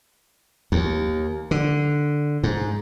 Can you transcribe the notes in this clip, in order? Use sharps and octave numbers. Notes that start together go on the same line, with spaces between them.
D#2
D3
G#2